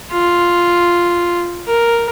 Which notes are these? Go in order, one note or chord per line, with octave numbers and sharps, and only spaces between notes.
F4
A#4